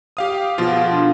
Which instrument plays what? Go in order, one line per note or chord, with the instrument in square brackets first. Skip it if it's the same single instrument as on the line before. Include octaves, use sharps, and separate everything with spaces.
[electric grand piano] G4 F5 D#6
[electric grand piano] B2 F3 F4 [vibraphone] G#4 F5 F#5
[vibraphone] A4 F5 C6
D4 D#4 F5